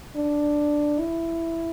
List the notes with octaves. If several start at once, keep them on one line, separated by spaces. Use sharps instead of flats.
D4
E4